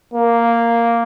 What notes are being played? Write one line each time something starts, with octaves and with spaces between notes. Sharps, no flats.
A#3